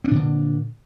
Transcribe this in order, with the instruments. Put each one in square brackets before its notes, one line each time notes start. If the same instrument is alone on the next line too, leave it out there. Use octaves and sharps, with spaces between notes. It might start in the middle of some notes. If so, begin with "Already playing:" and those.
[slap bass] C4
D4
A#2
D3